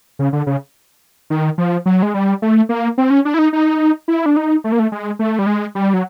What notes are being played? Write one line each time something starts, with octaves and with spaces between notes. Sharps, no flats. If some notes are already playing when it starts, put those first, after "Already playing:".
C#3
D3
C#3
D#3
F3
F#3
G#3
G3
A3
A#3
C4
C#4
D4
E4
D#4
D#4
E4
D4
D#4
A3
A#3
A3
G#3
A3
G3
G#3
G3
F#3